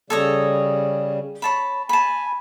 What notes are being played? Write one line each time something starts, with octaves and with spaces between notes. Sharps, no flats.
C#3 G3 A4 C#5 D#5
C#5 A5 B5
G#5 A5 B5